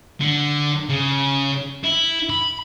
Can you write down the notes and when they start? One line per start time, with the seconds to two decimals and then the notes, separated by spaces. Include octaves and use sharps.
0.20 D3
0.90 C#3
1.83 E4
2.30 B5